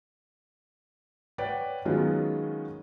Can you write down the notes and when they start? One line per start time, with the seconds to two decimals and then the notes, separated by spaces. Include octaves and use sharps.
1.38 B4 C#5 D5 F#5 G5
1.85 D#3 F#3 G#3 B3 C#4 F4